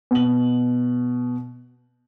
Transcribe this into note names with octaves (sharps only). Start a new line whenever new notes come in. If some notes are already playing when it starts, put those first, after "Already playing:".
B2 F#7